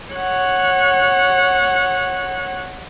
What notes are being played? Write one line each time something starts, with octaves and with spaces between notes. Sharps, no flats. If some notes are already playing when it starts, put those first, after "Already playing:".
C#5 F#5